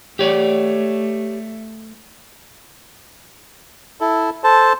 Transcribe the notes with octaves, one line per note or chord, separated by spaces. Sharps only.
A3 G4 C#5 D5
E4 A4
A4 C5 A5